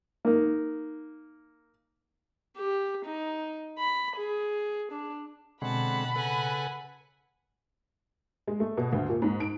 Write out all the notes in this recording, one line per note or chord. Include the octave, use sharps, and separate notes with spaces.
A#3 D#4
G4
D#4
B5
G#4
D4
B2 D3 G#3 C4 F#5 A5 B5
C#3 A4 B4 F#5 G#5
G#3
A3
B2
D2
A#2
G#2
D7